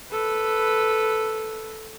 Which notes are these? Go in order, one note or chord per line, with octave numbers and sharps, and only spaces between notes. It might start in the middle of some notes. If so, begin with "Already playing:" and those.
A4 B4